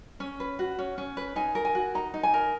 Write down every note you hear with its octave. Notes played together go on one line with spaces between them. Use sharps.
C#4
B4
F#4
C#4
C#4
B4
D#4 G#5
A#4
G#5
F#4
D#4 A#5
D#4
G#5
A#4